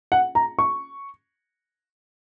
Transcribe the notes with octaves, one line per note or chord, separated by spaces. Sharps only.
F#5
A#5
C#6